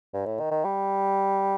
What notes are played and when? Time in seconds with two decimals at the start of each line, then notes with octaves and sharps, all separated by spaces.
0.14 G2
0.26 A2
0.40 D#3
0.52 D#3
0.65 G3